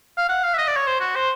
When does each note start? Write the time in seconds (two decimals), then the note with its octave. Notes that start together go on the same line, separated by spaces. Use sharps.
0.18 F5
0.29 F#5
0.43 F5
0.54 E5
0.58 D#5
0.68 D5
0.76 C#5
0.87 C5
1.01 F#4
1.15 C5